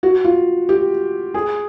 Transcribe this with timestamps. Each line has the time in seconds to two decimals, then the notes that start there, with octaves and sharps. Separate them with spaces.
0.03 F#4
0.24 F4
0.69 G4
1.34 G#4